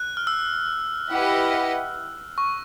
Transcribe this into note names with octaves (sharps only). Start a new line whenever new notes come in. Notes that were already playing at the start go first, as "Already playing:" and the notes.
Already playing: F#6
F6
E6
E4 G4 B4 D#5 F#5
C#6